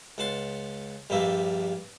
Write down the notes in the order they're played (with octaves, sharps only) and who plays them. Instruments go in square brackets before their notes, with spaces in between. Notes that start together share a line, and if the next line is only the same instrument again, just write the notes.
[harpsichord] C#2 F#5 A5 C6
A#1 G2 F3 G3 A#3 E5